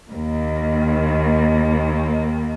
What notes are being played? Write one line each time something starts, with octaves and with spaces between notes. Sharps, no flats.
D#2 D#3 A#3